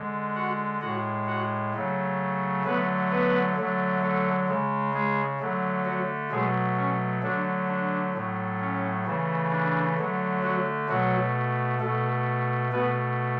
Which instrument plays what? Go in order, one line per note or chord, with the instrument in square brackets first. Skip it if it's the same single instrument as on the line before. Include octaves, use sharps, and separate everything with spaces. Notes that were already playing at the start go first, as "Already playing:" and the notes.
Already playing: [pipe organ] D3 G#3
F#4 F#5
A2 G#3 F#4 F#5
F#4 F#5
C#3 F#3 A3
D3 F#3 A3 B3 B4
B3 B4
D3 F#3 A3
A3 A4
C#3 G#3
G#3 G#4
D3 F#3 A3
F#3 F#4
B2 F#3 G#3 A3 G#4
C#4
D3 F#3 A3 D4
D4
A2 F#3 A3
C#4
C#3 E3 A3
D4
D3 F#3 A3
F#3 F#4
B2 F#3 A3 F#4
B2 A3 A4
B2 A3 B3 B4